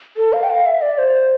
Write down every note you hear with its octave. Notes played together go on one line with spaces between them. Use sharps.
A4
F5
G5
F5
E5
D5
C5